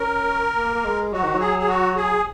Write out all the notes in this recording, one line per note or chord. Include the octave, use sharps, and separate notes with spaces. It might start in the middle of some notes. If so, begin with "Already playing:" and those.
Already playing: C#4 A#4
A#3
A#3
G#3
F#3 F#4
D#3
F#3
G#4
G#4
F#4
G#4